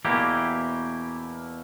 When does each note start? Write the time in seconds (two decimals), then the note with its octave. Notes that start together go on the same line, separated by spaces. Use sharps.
0.05 E2 B2 A#3 E4 G4